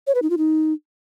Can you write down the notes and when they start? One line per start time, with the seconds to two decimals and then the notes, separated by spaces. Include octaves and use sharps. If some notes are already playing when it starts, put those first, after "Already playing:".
0.07 C#5
0.15 B4
0.22 D#4
0.30 F4
0.38 D#4